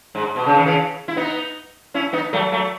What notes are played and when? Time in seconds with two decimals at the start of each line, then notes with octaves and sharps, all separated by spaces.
0.15 G#2
0.36 B2
0.46 C#3
0.56 D#3
0.66 C#3 E3
1.08 E4
1.16 B3 D#4
1.94 C#4 E4
2.13 B3 D#4
2.33 F#3 A3
2.52 F#3 A3